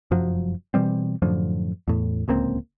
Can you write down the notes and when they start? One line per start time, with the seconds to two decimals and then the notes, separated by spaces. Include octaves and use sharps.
0.11 F1 F#2 F3 F#3
0.74 B2 E3 G3 C4
1.22 F#2 A2 D3 F3
1.88 E2 A2
2.28 D1 C#2 A#3 C4